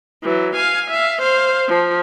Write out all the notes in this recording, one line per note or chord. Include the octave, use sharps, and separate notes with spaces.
E3 F#3
F5 G#5
E5 F5
C5 F5
F3